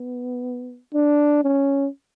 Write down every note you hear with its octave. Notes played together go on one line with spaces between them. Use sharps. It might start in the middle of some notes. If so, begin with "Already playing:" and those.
Already playing: B3
D4
C#4